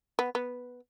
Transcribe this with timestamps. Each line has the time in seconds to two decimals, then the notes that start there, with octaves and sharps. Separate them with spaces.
0.19 B3
0.35 B3